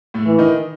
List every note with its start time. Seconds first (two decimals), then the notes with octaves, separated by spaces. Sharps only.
0.14 A2 A3
0.26 E3
0.39 D#3 D#4